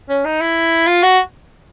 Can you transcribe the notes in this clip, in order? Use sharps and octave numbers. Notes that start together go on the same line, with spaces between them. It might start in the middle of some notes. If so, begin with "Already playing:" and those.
C#4
D#4
E4
F4
F#4